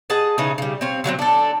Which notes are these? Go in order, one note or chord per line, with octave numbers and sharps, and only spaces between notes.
G#4 D#5 F#5 A5
C#3 E3 C#4 D#4
C#3 G3
C4 C#5 F5
D3 F#3 A#3 C4
D4 A4